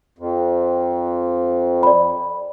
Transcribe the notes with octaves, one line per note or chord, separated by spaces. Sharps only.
F2
D5 B5